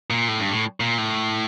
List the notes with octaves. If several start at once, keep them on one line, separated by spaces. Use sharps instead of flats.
A#2
A2
G2
A2
A#2
A2